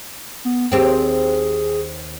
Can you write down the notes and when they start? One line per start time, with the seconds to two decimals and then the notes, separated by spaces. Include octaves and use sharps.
0.45 B3
0.72 D#2 C4 G4 G#4